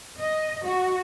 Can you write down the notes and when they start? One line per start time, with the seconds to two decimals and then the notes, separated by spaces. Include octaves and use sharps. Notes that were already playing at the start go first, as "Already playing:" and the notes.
0.19 D#5
0.65 F#4